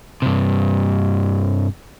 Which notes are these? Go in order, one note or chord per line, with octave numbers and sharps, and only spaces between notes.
G2 C3